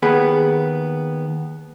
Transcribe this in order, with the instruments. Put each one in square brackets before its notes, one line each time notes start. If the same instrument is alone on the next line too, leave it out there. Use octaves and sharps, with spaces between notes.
[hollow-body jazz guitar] D#2 B3 G#4 B5